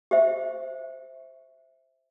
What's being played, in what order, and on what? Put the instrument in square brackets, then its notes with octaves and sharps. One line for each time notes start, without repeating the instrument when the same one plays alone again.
[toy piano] G4 C5 E5